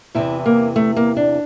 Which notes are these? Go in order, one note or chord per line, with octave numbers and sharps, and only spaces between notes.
E2 C3 E3 E4
A#3
A3
A#3
D4